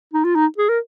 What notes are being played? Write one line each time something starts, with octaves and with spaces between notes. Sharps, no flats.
D#4
F4
D#4
G#4
A#4